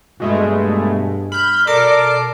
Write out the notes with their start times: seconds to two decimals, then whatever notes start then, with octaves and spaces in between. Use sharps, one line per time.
0.20 G2 B2 G#3 A3
1.32 B5 F6 G6
1.67 B2 A4 A#4 D5 D6 C7